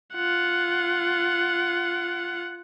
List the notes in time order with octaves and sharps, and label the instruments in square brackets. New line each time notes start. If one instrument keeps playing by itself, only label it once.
[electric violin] F4 F#5